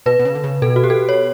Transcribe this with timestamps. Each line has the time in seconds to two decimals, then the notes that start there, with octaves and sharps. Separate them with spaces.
0.06 B2 B4
0.20 B2
0.25 C#3
0.35 D3
0.44 C#3
0.62 B2 A4
0.76 F#4
0.84 G4
0.90 A4
1.09 C#5